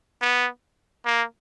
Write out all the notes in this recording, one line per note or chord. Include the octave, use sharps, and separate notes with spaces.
B3
A#3